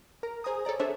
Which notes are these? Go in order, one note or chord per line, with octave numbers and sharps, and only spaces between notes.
A#4 A#5
G#4 C5 G#5 A#5 D#6
A4 C#5 D5 A#5
D4 G#4 A4 C5 C#5 E5